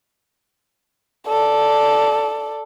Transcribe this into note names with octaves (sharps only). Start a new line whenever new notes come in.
A4 D5